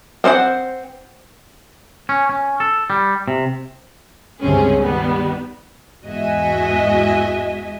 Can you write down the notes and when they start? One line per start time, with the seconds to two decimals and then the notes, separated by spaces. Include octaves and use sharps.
0.24 C4 C5 F5 F#5
2.09 C#4
2.29 C#4
2.60 A4
2.90 G3
3.28 C3
4.41 C#2 G2 C3 C4 C#4 G#4
4.80 D#3 G3 B3
6.04 E2 G#2 F#4 D#5 E5 G#5